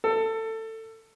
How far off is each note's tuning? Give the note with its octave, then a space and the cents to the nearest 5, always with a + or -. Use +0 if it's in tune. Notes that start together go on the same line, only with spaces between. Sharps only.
A4 +20